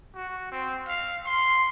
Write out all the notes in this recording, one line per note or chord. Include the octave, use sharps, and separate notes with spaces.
F#4
C4
F5
C6